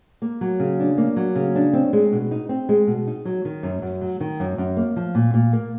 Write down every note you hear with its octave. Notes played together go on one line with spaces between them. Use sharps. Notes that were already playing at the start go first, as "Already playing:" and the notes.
A#3
F#3
C#3
D4
A#3
F#3
C#3
D4
C4
G#3
B2
D#4
C4
G#3
B2
D#4
F#3
D#3
F#2
F#2
F#3
D#3
F#2
F#2
A#3
F3
A#2
A#2
A#3